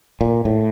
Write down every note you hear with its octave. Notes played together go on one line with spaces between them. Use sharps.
A#2
A2